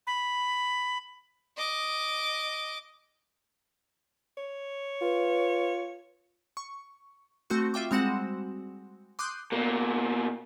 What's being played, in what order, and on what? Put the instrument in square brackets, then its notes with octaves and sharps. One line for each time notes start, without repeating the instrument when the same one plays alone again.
[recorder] B5
[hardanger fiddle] D#5 D6
[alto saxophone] C#5
[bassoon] F4 [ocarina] B4
[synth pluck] C#6
A3 C4 F#4 C#6
F4 E5 G5 D6
G3 G#3 C4 F#4 F#5 E7
C6 D6 D#6 F#6 G6
[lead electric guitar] B2 A#3